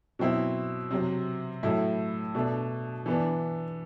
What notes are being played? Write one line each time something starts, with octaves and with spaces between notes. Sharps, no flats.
B2 F#3 C4 E4
C3 F#3 C4
A2 F#3 A3 E4
B2 A3 D4
E3 B3 D4